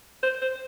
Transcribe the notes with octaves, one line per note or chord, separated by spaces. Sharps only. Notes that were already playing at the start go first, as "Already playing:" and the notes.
C5
C5